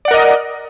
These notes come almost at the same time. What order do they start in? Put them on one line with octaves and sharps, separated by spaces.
D5 F#5 A#4 D#5